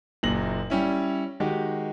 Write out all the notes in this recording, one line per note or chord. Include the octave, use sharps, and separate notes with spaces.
F#1 F#2 A#2 A#6 F#7
G3 C#4 E4
D#3 G#3 F#4 G4